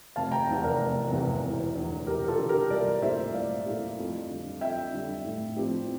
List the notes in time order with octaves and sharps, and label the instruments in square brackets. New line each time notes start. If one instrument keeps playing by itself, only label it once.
[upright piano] F1 [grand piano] F5 A5
[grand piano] G5 A#5
[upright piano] E2 C3 E3
[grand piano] A#4 D5
[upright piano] F1
E2 C3 E3
E1
E2 D3
[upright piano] E1 [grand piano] G4 A#4
[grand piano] F4 A4
[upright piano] E2 D3
[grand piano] G4 A#4
[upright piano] C2 [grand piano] A#4 D5
[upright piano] A#2 A3 E4 G4 [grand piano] C5 E5
[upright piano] C2 [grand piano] D5 F5
[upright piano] A#2 A3 E4 G4
F2
D3 G3
[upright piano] F2 [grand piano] E5 G5
[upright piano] D3 G3
A2
F3 C4 E4 G4